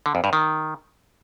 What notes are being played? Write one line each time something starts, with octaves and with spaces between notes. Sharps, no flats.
D3
F2
G2
D#3